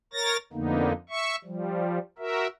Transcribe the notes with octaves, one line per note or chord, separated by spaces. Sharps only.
A#4 C#5 A6 A#6
F2 D3 A#3 B3 D#4
E5 C#6
F3 G3
F#4 A#4 E5